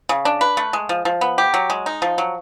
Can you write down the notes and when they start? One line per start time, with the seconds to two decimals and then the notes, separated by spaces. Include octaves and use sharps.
0.09 C#3
0.25 D4
0.41 B4
0.57 A3
0.73 G#3
0.89 F3
1.05 F3
1.21 B3
1.38 G4
1.54 F#3
1.70 G#3
1.86 D#4
2.02 F3
2.18 F#3